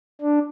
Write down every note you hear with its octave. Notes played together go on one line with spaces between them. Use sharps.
D4